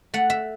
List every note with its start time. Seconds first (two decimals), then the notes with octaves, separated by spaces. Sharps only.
0.14 A3 F#5
0.30 E5